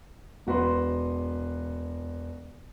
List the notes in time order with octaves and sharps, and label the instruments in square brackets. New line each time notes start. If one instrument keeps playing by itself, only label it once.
[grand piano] E1 F#4 B4 C6